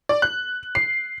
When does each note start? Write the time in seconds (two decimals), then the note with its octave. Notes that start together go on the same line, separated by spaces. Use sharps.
0.09 D5
0.22 F#6
0.75 C7